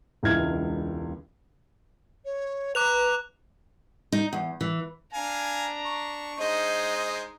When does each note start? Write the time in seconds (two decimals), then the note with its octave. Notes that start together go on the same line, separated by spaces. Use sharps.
0.23 E1 C#2 E3 E4 F6 G#6
2.25 C#5
2.75 B4 A#5 D6 F#6 F7
4.12 D#4
4.33 E2
4.61 E3
5.13 D4 F5 G#5 A#5
5.85 C#6
6.40 G#3 D#4 C5 D#5